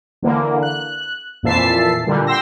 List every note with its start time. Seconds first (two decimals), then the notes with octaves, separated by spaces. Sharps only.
0.22 D3 E3 A#3
0.63 F#6
1.43 F2 A#2 E3 E5 A5 C7
2.07 A#2 D3 G3
2.27 G5 C6 E6 A#6